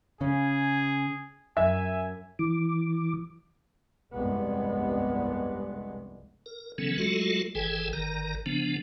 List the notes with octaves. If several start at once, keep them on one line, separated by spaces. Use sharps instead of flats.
C#3 C#4 G#4
F#2 E5 G#5
E3 D6
F1 C2 G2 G#3 B3
A#4
C#3 E3 F#3 B3 C#4 A4
F#3 G#3 A3 F4 F#4 A4
G1 E3 G#4 A4 G5 G#5
G1 D#3 A#4 A#5
C#3 F3 B3 D4